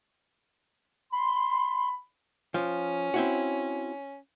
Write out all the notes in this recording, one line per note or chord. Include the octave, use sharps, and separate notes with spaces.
B5 C6
F3 C#4
C4 E4 F#4